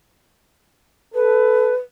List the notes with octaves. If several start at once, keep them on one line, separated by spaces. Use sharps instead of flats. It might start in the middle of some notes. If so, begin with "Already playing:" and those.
A4 B4